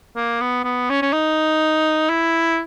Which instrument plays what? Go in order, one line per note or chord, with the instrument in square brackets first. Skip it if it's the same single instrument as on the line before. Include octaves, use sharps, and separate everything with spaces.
[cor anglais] A#3
B3
B3
C#4
C#4
D#4
E4